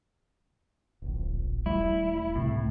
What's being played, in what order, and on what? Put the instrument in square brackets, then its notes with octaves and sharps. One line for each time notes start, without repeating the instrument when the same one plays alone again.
[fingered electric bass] D1 A#1
[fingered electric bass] D#1 G3 A3 [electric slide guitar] E4
[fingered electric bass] C#2 C3 [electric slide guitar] A2